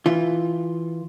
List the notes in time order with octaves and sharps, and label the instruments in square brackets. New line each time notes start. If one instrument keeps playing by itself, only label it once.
[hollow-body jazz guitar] E3 F4